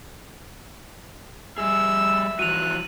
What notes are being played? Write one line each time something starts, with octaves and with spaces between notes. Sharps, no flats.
G3 G#4 E5 E6
E3 F3 F#4 F#6 D#7 F7